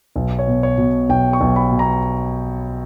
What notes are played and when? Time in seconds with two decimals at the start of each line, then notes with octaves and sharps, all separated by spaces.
0.16 B1
0.39 C#5
0.47 B2
0.63 C#5
0.78 B2
1.09 B1 G5
1.33 C#6
1.41 B1
1.56 B5
1.72 B2
1.79 A#5